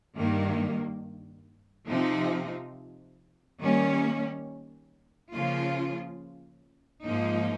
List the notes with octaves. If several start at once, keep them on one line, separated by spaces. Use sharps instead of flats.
G2 D#3 A#3
C3 F3 C4 D#4
D#3 G3 A#3 C#4
C#3 F3 A#3 F4
G#2 F3 A#3 D#4